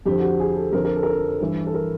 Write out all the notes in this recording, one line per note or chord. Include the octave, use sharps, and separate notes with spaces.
F2 D3 F3 G4
F#4
G4
G#4
A4
F2 D3 F3 A#4
A#4
A4
A#4
A4
G2 E3
A4
A#4